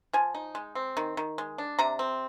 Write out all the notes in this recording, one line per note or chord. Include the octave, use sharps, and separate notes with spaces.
F3 G#5
D#4
G#3
C4
D#3
D#3
G#3
D4
C3 A#5
C4